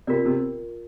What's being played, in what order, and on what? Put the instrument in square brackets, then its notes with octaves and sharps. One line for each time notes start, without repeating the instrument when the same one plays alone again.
[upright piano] C3 [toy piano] F4 A#4 D5
[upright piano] C3